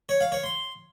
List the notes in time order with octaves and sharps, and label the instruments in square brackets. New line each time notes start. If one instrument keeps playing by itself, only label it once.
[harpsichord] C#5
F5
C#5
C6